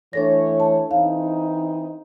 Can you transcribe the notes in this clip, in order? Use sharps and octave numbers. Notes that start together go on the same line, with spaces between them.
E3 A3 D4 A4 C#5 A#6
A5
E3 C4 D#4 F5